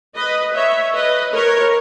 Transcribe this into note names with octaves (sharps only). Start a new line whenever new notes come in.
B4 D#5
C#5 E5
B4 D#5
A#4 C#5